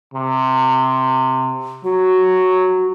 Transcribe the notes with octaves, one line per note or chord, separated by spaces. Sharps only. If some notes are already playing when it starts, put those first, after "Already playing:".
C3
F#3 F#4